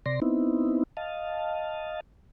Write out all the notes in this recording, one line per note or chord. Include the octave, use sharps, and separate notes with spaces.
C3 D5 C6 A#6
B3 C4 D#4 E4
D#5 F5 A5